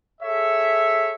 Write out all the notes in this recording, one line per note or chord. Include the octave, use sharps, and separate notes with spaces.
G#4 A4 C#5 E5